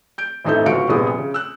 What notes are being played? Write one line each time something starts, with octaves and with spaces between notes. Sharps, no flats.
G6 D7
A1 F2 D#4 A4 E5 G6
G1 C#2 F#4 F5 C#7 D7
F1 A#1 G3 B3 G#4 D#6
C#3
E6 F#6